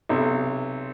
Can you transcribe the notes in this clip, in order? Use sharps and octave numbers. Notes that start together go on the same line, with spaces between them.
B1 C3